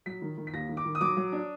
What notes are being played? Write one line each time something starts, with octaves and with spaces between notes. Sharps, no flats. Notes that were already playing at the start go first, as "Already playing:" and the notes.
F#3 B6
D#3
D#3
B6
D#2 A#6
D#3
D6
D#3
D#6
F#3 D6
F#3
D4